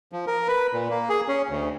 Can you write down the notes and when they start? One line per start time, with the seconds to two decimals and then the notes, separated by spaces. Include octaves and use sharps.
0.12 F3
0.27 A#4
0.48 B4
0.73 A#2
0.90 A#3
1.09 G#4
1.28 C#4
1.49 D2